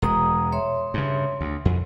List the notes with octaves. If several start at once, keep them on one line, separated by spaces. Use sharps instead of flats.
E1 G#3 A#5 D#6
C#5 E5 C6
G2 C#3
D2
F2